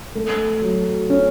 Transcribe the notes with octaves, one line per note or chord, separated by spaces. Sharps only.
A3
F#3
C#4